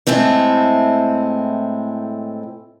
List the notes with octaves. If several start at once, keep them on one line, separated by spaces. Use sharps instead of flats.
A2 G#3 A3 C4 E4